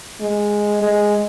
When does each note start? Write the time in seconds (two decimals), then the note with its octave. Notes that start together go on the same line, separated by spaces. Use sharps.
0.21 G#3
0.82 G#3